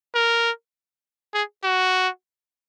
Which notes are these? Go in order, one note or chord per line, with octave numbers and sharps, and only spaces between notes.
A#4
G#4
F#4